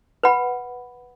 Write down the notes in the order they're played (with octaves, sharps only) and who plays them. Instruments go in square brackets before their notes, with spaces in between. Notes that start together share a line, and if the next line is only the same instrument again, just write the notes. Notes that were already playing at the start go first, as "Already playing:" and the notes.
[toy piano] B4 F#5 B5